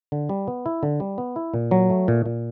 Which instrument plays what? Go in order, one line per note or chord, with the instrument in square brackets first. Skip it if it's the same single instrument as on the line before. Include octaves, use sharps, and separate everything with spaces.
[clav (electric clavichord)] D3
G3
B3
E4
D3
G3
B3
E4
A#2
F#3
A3
A#2
A#2